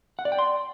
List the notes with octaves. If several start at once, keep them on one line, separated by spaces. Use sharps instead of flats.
F#5
D5
G5
C6